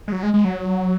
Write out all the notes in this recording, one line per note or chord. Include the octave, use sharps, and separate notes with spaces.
G#3
F#3
G#3
G#3
F#3